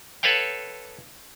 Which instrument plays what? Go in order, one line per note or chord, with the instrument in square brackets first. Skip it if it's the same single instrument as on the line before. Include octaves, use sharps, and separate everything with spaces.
[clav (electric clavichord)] A4 B4 C#5 F5 G5